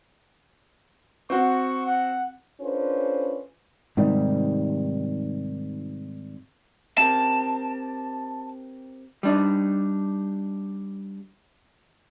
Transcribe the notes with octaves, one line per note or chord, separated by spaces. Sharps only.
C4 F#4 C#6
F#5
C#4 D4 F4 A4 B4 C5
G#2 C3 D#3 G3
C4 G4 A#4 A5
G3 D4 D#4